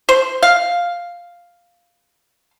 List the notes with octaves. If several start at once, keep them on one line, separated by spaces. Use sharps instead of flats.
C5
F5